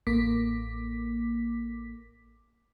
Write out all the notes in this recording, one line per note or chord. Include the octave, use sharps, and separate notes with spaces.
A1 A#3 D6 B6